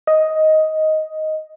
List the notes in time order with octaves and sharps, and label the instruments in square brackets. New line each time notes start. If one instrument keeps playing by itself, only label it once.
[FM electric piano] D#5